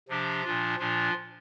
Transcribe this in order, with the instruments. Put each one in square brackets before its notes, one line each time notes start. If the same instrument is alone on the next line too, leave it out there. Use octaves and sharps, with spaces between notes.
[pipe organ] C3 F3 D4 G4
A#2 F3 D4 F4
A#2 F3 D4 F4